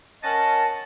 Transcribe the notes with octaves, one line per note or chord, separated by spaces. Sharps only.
C#4 A#4 D#5 F#5 A5